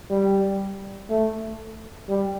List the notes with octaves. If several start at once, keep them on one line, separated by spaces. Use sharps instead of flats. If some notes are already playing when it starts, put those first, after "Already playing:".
G3
A3
G3